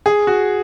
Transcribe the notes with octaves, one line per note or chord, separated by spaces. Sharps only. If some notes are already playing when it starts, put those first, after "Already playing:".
G#4
F#4